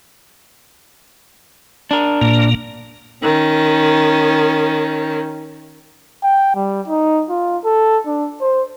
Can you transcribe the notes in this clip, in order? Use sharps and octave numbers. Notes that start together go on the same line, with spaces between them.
D4 A#4
A#2 A#3
D#3 C#4
G5
G3
D#4
F4
A4
D4
C5